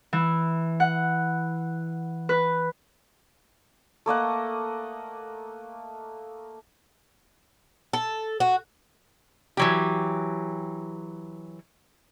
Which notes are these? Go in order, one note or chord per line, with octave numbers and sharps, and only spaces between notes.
E3
F#5
B4
A3 A#3 D#5 F#5
A4
F#4
E3 F#3 G4